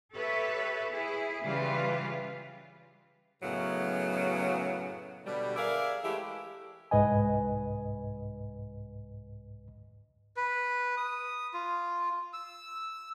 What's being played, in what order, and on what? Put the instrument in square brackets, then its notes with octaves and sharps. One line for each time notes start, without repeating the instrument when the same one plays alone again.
[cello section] G4 A4 B4 C#5 E5
E4 G#4
C#3 E3 G3 F4 G4 B4
[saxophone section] F#2 A2 C#3 F#3 B3
B2 D3 G3
G#4 A#4 D5 E5 F5
E3 G#3 A3 E4 G4
[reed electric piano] C2 G#2 B4 D#5 G#5
[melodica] B4
D#6
F4
E6